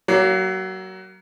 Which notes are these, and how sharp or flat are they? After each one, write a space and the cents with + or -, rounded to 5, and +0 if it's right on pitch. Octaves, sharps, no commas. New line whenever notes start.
F#3 +25 A#3 +0